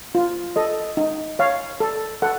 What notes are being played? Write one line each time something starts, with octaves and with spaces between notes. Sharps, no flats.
F4
A4 D#5
D#4
C#5 F5
A4
A4 F#5